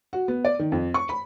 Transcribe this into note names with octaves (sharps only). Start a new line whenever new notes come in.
F#4
B3
D5
D#3
F2
C#6
B5